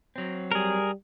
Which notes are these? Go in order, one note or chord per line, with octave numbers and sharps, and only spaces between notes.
F#3 C4
G3 G#4 A#4